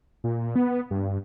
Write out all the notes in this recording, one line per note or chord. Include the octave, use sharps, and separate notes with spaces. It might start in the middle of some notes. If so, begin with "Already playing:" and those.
A#2
B3
G2